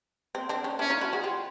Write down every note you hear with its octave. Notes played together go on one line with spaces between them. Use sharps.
C4
C4 D4
C#4 D#4
C#4 D4 E4
D#4 F4
E4 F#4
F#4 G#4
F4 G4